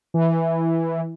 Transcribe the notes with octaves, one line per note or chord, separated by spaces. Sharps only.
E3